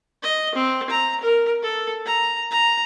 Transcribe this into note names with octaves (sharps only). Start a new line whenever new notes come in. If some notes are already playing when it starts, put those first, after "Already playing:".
D#5
C4
A#5
A#4
A4
A#5
A#5